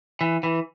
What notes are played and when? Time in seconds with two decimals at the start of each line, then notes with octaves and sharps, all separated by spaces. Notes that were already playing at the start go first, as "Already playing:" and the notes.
0.21 E3
0.43 E3